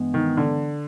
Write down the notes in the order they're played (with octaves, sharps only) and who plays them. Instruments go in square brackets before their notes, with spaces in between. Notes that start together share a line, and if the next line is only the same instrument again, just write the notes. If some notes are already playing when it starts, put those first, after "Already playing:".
Already playing: [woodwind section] G2 E3 G#3 B3
[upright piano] D#3
D3